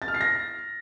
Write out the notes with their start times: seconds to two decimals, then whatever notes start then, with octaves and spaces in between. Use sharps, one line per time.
0.02 A6
0.08 F6
0.14 C7
0.21 A#6